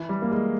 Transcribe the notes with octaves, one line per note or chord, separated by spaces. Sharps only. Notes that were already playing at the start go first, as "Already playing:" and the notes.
Already playing: E3
G3
A#3
G#3